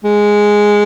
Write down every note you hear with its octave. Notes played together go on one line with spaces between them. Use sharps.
G#3